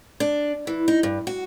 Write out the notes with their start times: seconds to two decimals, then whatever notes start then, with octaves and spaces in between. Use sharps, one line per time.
0.20 D4
0.67 E3
0.88 D#4
1.03 G2
1.27 F#4